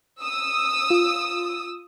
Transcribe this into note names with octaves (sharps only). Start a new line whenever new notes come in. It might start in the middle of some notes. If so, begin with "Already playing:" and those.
D#6 E6
F4